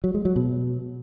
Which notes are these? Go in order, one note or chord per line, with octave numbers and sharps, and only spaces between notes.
F#3
G#3
F#3
B2